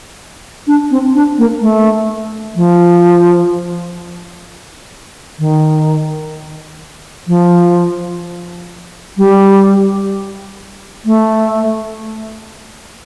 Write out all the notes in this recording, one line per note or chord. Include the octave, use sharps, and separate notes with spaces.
D4
C4
D4
A#3
A3
F3
D#3
F3
G3
A3